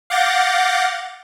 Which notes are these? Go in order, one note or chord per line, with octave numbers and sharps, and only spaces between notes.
F5 F#5 D6 G6 A6 A#6